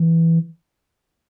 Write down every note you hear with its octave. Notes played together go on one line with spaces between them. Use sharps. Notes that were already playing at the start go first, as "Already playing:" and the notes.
Already playing: E3